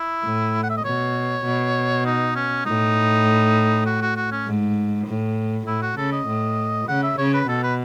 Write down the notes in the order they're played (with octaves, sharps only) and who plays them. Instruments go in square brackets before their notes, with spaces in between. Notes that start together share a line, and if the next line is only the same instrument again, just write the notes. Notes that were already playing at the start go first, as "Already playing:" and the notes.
Already playing: [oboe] E4
[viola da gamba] A2
[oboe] F#5
E5
D#5
[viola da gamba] B2 [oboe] C#5
[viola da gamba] B2
[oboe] D#4
C#4
[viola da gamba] A2 [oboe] D#4
[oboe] F#4
F#4
F#4
C#4
[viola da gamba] G#2
A2
[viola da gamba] A2 [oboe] E4
[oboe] F#4
[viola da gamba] C#3 [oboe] A4
[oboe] D#5
[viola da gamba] A2
[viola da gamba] C#3 [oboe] F#5
[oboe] E5
[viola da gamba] C#3 [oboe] C#5
[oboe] B4
[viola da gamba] B2 [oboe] A4
[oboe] B4